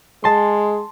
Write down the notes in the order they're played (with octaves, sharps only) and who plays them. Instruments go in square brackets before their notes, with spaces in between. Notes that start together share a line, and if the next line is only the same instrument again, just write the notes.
[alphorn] G#3 [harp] A5 C6